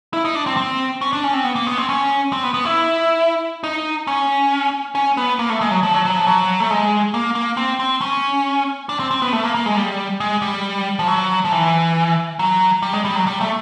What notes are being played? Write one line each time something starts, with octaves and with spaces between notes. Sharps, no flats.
E4
D#4
D4
C4
C4
C#4
D4
C#4
C4
B3
A#3
B3
C4
C#4
C4
B3
B3
E4
D#4
C#4
C#4
B3
A#3
A3
G#3
F#3
F3
F#3
F#3
F3
F#3
A3
G#3
A#3
A#3
C4
C4
C#4
D4
C4
C4
B3
A3
A#3
A#3
G#3
G3
G#3
G3
F3
F#3
F3
E3
F#3
G3
G#3
G3
F#3
G3
A3